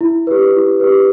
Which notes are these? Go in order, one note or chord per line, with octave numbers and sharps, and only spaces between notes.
E4
G4 B4
E4
G4 B4